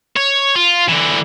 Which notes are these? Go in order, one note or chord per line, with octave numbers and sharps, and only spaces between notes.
C#5
F4
D3 E3